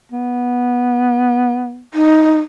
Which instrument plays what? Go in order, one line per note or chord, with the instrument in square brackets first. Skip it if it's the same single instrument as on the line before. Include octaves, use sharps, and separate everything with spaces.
[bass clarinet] B3
[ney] D#4